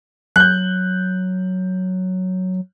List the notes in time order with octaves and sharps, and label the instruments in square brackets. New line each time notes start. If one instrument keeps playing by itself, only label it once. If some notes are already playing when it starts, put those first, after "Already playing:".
[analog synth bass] F#3 [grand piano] F#6 G6